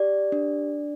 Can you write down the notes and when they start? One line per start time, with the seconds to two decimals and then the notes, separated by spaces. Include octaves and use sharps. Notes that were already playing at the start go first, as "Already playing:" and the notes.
Already playing: G4 D5
0.32 D4